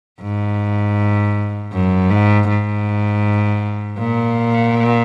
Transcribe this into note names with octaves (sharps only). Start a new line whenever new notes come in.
G#2
F#2
G#2
G#2
A#2